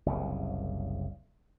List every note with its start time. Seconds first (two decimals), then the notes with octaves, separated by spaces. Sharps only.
0.06 F#1 C2 C#3